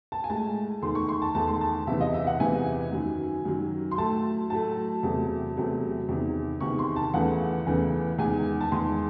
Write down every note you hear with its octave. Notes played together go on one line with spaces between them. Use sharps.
A5
G#5
A2 G#3 A5
E2 D#3 A3 C6
C#6
C6
A5
E2 D#3 A3 A5
C6
A5
E2 C3 E3 E5
D#5
E5
F#5
E2 C3 E3 G#5
F#2 D#3 F#3
F#2 D#3 F#3
C6
A2 F#3 A3 A5
A2 F#3 A3 A5
E2 C3 F#3 A3
E2 C3 F#3 A3
E2 C3 D#3
E2 C3 D#3 C#6
C6
A5
E2 C#3 E3 A3 F#5
E2 C#3 E3 A3
E2 D#3 G#3 G#5
A5
E2 D#3 G#3 C6